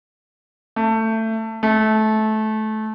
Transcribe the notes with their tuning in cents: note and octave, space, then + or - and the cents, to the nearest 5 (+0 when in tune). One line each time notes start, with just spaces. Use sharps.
A3 +20
A3 -20